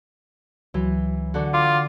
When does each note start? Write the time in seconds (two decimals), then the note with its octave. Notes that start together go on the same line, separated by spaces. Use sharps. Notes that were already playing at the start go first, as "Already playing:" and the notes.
0.74 C#2 E3 F#3
1.34 D3 F#4
1.54 F4 D6